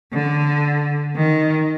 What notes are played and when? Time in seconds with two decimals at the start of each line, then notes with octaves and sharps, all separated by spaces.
0.13 D3
1.16 D#3